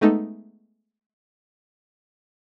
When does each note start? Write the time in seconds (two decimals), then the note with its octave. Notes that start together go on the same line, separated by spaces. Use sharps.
0.01 G#3 A3 B3 D#4 A4